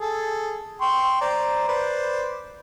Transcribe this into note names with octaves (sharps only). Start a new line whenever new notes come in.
G#4 A4
G5 C6 C#6
C5 D5 A#5
B4 C5 D5